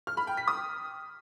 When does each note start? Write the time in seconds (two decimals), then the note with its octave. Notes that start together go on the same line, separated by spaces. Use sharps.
0.07 F6
0.17 B5
0.27 G5
0.37 B6
0.48 D#6